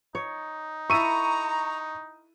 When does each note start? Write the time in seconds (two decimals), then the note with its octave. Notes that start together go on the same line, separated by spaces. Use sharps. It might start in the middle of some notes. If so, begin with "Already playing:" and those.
0.15 D#4 C#5
0.90 E4 A4 E5 A#5 C#6 D#7